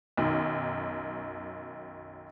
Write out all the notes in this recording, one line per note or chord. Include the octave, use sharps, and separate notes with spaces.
B1 F#2 D#3